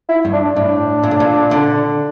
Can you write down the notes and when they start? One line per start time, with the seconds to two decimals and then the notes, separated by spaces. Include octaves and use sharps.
0.09 E4
0.25 G2
0.33 D4
0.56 A2 D4
1.04 A#2
1.11 A2
1.20 A#2
1.51 D3